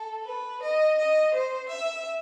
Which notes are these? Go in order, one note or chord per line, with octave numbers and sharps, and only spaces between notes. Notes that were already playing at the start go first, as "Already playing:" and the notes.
Already playing: A4
B4
D#5
D#5
C5
E5